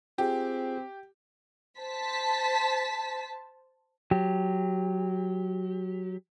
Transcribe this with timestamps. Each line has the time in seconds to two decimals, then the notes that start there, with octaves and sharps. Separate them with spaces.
0.18 C4 F4 G4 G#4
1.79 C5 A5 B6
4.11 F#3 G4